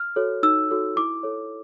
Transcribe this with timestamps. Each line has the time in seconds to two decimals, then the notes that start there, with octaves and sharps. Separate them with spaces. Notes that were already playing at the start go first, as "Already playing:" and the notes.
Already playing: F6
0.16 F#4 A4 C#5
0.43 D#4 E6
0.70 F#4 A4 C#5
0.96 E4 D6
1.23 A4 C#5